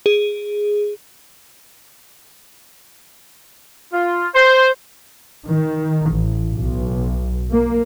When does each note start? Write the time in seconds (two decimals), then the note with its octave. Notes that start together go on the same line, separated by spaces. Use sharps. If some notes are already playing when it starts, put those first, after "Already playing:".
0.06 G#4
3.93 F4
4.35 C5
5.47 D#3
6.07 A1
6.53 B1
7.51 A#3